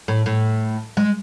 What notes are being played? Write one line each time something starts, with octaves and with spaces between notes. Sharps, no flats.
A2
A2
G#3